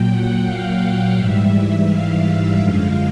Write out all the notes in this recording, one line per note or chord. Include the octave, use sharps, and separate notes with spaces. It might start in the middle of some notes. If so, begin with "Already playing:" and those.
Already playing: A#2 F#3 G5
F#5
F5
G#2 E3 G3 E5
F5
F#2 D3 F3 G#3